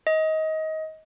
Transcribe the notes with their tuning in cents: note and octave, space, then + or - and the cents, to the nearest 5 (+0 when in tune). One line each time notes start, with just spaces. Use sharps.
D#5 +25